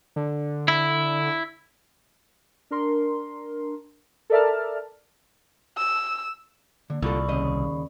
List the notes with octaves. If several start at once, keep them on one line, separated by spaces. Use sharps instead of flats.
D3
E4
D4 A#4 C6
A4 A#4 D5 E5 A5 F6
E6
D3 A#3
C2 D3 F4 A4 D5 B5 C#6
D#2 C#3 D#5